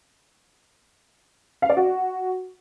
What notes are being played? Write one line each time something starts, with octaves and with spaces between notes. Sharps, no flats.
F5
D5
F#4